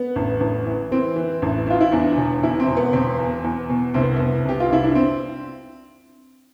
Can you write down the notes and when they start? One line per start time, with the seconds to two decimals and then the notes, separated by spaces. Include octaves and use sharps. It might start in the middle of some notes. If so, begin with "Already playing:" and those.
Already playing: B3
0.16 A1
0.40 A1
0.66 E3
0.91 E3 C4
1.16 E3
1.42 A1
1.67 E3 F4
1.81 E4
1.92 E2 D4
2.17 E1
2.43 E2 E4
2.60 C4
2.67 E1
2.77 B3
2.93 E1 C4
3.19 E2
3.44 E2
3.69 B2
3.94 C2 C4
4.02 B3
4.16 C2 B3
4.45 C2 G4
4.60 F4
4.70 C2 E4
4.84 D4
4.95 C4